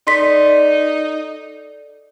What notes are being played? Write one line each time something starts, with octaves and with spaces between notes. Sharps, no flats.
D#4 A4 D5 D#5 C6 B6